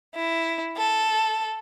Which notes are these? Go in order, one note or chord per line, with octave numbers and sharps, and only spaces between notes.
E4
A4